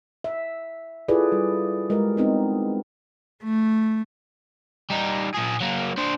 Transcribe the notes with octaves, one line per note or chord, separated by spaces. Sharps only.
E5
E4 F4 G#4 A4 B4 D5
G3
G#3 G4 A#4
B3 C4 D#4
A3
G3 D#4
A#2 G#4
F#3 A#3
D4 C5